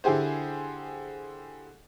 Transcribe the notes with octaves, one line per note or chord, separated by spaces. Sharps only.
D3 E4 G4 G#4 C5